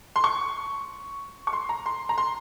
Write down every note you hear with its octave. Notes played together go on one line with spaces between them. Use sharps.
C6
C#6
C#6
C6
A#5
C6
A#5
C6